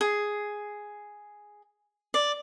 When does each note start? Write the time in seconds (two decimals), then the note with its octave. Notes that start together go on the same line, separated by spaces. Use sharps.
0.01 G#4
2.14 D5